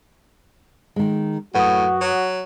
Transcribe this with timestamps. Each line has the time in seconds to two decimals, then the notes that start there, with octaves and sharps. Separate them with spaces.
0.96 D#3 G#3
1.55 F#2 A2 F#4 B4 F#5 D#6
2.01 F#3